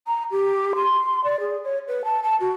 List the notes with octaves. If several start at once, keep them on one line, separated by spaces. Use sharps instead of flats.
A#5
G4
C6
D5
G#4
C#5
B4
A5
A5
F#4